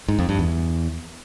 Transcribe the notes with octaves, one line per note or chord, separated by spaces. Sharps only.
G#2
F2
G2
E2